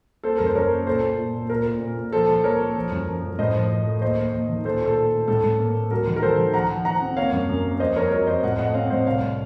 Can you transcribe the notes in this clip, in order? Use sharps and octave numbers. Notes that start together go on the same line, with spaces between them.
A#3 A4 C5
F#2 A#4
C5
F#2 A#4 C#5
A#3
A#2 A4 C5
A#2
A#2
A#2
A#2 A#4
A#2
A#2
A#2
F3 A4 C5
F3
A#3 A#4 C#5
A#3
F3
F#2
F3
F#2
A2 C5 D#5
F3
F3
A3
D#2 C5 D#5
D#2
D#2
D#3
A#2 A4 C5
A#2 A4
A3
A3
A2 A4
A2
A#3
A#3
F#3 A#4
D#3
A#4
D#3 A4 C5
D#3
F3 F#5 A#5
F3
F3 F#5 A#5
C4
A#3 C#5 F5
F#2
F#2
A#3
F2 C5 D#5
F2 A#4 C#5
F#3 A#4 C#5
F2 C5 D#5
A2 D#5 F#5
A3 D#5 F#5
C4 C#5 F5
A2 C5 D#5
C2 C#5 F5